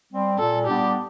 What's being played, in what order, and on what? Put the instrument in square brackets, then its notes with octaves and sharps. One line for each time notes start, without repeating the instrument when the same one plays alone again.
[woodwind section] G3 C4
[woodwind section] A#2 [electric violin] A4
[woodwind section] G3 B3 D4 [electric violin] G4